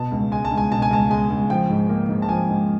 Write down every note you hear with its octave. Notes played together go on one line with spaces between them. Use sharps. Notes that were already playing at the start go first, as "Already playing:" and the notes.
Already playing: B2 A5
C#2
G#3 G#5
A5
C#2
G#5
B2 A5
G#5
C#2 A5
G#3 G#5
C#2
F3 G5
G#2
A#3
G#2
A5
F3 G#5
G#2